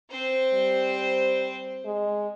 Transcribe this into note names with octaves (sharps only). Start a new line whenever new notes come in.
C4 C5
G3
G#3